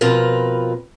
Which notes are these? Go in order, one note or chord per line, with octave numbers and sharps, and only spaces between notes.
F2 B2 C4 F4 A#4 B4